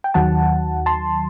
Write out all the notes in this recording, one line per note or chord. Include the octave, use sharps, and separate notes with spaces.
G5
D#2 D#3 F#3 F#5 A5
A5 C6